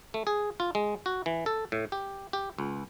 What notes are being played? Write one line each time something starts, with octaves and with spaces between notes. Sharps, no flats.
A3
G#4
F4
G#3
F#4
E3
A4
A2
G4
G4
C#2